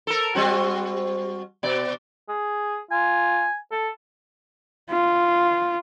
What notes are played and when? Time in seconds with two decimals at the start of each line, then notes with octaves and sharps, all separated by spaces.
0.07 A4 A#4
0.35 G3 C4 F#4
1.63 B2 D5
2.29 G#4
2.91 F4 G#5
3.72 A4
4.91 F4